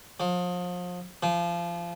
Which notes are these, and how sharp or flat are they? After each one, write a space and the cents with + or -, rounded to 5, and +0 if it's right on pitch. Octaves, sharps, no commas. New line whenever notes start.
F3 +35
F3 -25